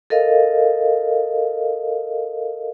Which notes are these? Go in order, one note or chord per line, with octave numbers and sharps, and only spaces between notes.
A4 A#4 D#5 F5